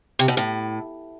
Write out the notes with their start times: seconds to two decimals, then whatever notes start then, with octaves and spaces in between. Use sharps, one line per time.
0.19 C3
0.28 B2
0.37 A2